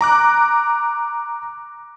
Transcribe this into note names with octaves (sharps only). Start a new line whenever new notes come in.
A#5 D6 F#6